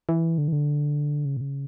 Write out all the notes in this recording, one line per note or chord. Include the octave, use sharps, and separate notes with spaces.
E3
D3
E3
D3
C#3
A#2
C#3